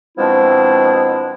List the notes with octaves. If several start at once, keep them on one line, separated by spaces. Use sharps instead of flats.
B2 F3 G#3 C4 D4 E4